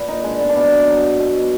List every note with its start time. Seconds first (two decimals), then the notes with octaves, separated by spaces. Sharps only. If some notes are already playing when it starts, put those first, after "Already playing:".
Already playing: A#2 B4
0.08 D#4
0.24 G#3 D4
0.40 B3
0.49 D4
0.56 B2 B3
0.87 F#3
1.19 B2